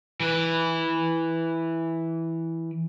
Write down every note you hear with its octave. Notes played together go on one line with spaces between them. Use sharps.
E3 B4